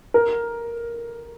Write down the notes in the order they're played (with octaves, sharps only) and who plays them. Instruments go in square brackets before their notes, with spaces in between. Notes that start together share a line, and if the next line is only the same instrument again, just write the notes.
[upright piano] A#4